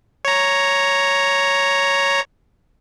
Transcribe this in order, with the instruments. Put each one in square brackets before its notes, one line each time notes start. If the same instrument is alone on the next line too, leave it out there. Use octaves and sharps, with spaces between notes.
[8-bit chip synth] C#5 A#5